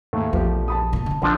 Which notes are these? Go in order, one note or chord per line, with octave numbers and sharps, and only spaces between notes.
D#2 G#2 A3
A#1 E2 F3 G4
A5 B5 D#6
F#2 A#2
D3 C#4
A#1 D3 F3 D4